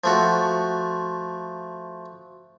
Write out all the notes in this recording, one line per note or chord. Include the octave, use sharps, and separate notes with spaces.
F3 A3 F#4